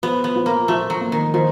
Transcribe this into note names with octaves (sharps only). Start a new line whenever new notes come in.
F3 B3
B3
F3
A#3
F3 A3
F#3
A#3
D#3
D#3 F3